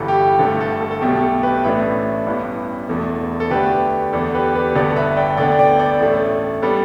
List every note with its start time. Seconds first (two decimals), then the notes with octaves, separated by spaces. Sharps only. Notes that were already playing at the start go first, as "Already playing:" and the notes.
Already playing: G1 G2 E3 G3 A4
0.08 G4
0.39 G1 G2 D3 A3 A4
0.60 A4
0.81 A4
0.91 A4
1.01 B1 B2 A3 G4
1.22 A4
1.43 G4 B4
1.63 A1 A2 A3 D4 B4 E5
2.26 A1 G2 E3 B3
2.89 E1 E2 B2 A3
3.40 A4
3.50 D2 D3 A3 D4 G4 B4
4.13 E2 D3 B3 D4 A4
4.35 G4 B4
4.55 G4 B4
4.75 G1 G2 D3 B3 A4 D5
4.96 B4 E5
5.17 D5 G5
5.37 D2 D3 B3 D4 D5 G5
5.59 D5 G5
5.79 A4 D5
6.00 A1 A2 A3
6.62 G3 B3 D4 A4